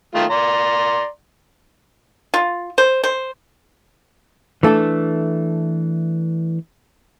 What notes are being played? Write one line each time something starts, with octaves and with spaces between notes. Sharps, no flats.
D#3 A3 F4
D5 A#5 C6
F4
C5
C5
E3 A3 D4 A4